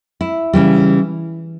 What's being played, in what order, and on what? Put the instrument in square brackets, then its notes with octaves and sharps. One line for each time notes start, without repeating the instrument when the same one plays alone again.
[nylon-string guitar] E4
C#3 E3 G3